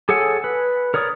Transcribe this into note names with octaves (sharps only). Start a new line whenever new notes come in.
G#4 A4 C#5 F#5 G#5
B4
A#4 C#5 D5 D#6